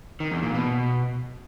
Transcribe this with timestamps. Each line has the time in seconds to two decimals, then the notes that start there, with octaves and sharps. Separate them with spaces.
0.20 D#3
0.32 E2
0.43 A#2
0.54 B2